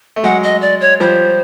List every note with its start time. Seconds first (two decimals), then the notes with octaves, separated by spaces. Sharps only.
0.16 A3
0.23 F#3 G#3 F#5
0.43 D#5
0.62 D5
0.81 C#5
1.00 F3 G3 C5